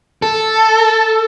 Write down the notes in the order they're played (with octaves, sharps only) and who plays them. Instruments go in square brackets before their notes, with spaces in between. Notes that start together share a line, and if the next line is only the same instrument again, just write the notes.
[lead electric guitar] A4